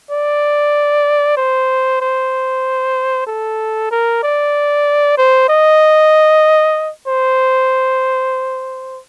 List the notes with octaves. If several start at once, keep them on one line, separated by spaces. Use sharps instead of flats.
D5
C5
C5
A4
A#4
D5
C5
D#5
C5